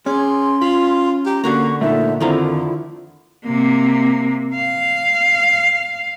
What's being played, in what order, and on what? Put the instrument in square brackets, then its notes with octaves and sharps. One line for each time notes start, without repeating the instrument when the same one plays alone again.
[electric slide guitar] C#4 [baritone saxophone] G#4 [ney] C6 [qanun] D6
[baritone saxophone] F4 [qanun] B5
[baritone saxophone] G4 [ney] A#5
[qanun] D3 F#4 A#5 [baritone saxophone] A#3 [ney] C#6
[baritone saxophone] A#2 [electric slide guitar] A3 D#4 A4 [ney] E5
[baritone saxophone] F2 [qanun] D3 F3 A3 [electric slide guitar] D#3 A#5 [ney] E4
[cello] C3 A#3
F5